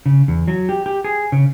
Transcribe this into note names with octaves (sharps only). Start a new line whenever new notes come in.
C#3
E2
F#3
G4
G4
G#4
C#3